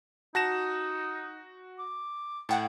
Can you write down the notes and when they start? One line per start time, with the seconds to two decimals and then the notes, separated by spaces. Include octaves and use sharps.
0.35 D#4 F#4 A5 A#6 E7
1.79 D6
2.49 A2 F#5 G5 A5